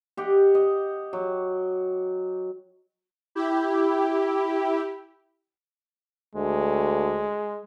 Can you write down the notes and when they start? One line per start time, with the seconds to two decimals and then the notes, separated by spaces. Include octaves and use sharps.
0.17 G4 D#5 F#5
0.55 D#5
1.13 F#3
3.35 E4 G4
6.35 D2 G#3